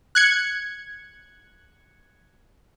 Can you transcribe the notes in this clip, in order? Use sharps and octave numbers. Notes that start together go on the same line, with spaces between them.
F#6 G#6 C#7